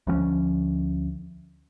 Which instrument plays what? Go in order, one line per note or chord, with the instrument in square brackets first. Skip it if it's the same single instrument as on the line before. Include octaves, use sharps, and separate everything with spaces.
[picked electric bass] D2 F3 A#3 C#4